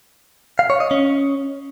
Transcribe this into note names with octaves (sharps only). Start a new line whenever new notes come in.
F5
C#5
D#5
C#4